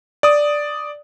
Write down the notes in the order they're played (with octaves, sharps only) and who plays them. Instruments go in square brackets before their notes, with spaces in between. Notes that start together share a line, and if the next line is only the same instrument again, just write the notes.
[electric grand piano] D5 D#6